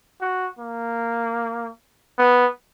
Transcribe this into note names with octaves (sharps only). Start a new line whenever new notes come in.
F#4
A#3
B3